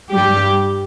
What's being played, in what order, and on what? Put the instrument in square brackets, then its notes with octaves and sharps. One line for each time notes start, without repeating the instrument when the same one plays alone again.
[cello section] G2 G3 G4